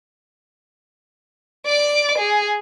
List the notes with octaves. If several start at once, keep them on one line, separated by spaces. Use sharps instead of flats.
D5 D6
G#4